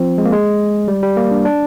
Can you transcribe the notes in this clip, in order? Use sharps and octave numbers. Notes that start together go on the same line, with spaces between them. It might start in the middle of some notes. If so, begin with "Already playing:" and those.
Already playing: F3 C4
G#3
A#3
G#3
G3
G3
A#3
D4
D4